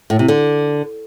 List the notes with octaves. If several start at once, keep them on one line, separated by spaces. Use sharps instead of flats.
A2
C3
D3